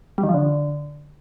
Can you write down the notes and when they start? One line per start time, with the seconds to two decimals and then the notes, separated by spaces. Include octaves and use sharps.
0.18 G3
0.23 D#3
0.29 F3
0.34 D3